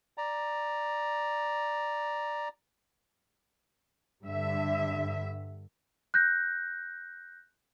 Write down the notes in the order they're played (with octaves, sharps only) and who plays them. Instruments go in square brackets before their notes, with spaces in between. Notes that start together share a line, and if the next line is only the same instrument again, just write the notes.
[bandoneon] D5 A#5
[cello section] G2 D3 E5
[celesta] F#6 G6 A#6